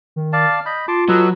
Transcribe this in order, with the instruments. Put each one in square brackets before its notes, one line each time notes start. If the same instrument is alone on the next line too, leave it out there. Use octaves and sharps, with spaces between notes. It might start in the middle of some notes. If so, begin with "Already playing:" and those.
[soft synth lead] D#3
[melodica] D5 F5 A5
[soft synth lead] F6
[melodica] D#5 B5 [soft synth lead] G6
[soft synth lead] F4 [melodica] A5 C6 D6
[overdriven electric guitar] F#3 [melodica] A4 B4 D#5